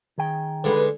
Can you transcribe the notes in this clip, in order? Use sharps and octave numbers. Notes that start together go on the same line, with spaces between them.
D#3 G#4 G5
D3 G#3 D#4 B4